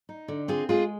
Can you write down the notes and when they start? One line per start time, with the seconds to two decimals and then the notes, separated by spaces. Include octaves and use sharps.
0.09 D#4
0.28 D3
0.48 C4 F4 G#4
0.69 G#3 F4 G#4